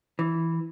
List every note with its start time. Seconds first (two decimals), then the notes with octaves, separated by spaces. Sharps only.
0.19 E3